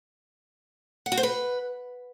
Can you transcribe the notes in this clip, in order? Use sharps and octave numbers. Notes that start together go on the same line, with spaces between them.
F#5
F#4
C5
B4